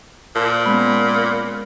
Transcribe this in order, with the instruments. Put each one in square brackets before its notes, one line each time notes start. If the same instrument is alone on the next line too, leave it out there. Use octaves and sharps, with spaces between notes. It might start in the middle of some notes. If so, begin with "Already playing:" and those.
[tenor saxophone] A#2 [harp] C5 A5
[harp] G#3 B3 C#4 [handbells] B5